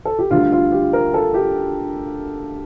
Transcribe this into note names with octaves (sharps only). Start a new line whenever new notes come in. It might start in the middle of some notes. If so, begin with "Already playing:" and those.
A4
G4
D2 D3 G3 F4
F4
G4
A#4
A4
G4